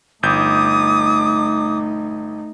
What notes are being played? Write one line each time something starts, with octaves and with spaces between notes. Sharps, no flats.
G1 A3 D#4 D6 D#6 G6